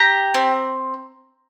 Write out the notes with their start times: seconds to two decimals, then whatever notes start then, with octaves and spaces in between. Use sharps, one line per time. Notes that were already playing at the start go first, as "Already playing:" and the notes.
Already playing: G4 A#5
0.34 C4